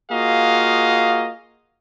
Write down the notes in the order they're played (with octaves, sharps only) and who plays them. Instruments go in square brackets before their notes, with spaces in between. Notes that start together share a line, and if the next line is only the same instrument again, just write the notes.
[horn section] A#3 F4 F#4 G#4 D#5 F5